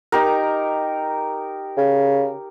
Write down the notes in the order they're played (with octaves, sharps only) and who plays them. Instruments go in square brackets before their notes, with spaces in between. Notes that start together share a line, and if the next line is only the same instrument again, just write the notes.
[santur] D#4 G4 A#4
[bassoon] C#3